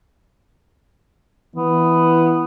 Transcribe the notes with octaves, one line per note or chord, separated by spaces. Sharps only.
E3 B3